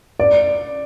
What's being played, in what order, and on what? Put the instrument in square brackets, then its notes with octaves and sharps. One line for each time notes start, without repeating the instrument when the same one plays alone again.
[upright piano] D5